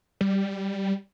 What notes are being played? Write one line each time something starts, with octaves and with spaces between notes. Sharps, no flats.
G3